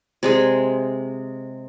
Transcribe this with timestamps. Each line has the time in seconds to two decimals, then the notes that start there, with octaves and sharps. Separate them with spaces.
0.23 C3 G#3 G#4